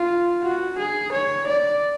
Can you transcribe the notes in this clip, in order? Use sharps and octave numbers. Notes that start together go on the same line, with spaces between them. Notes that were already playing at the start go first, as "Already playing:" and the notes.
Already playing: F4
F#4
G#4
C#5
D5